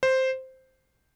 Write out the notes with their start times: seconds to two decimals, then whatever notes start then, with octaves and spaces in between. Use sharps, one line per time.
0.03 C5